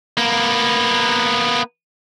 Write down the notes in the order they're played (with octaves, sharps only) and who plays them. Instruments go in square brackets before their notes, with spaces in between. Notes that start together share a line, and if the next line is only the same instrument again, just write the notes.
[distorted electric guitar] A#3 B3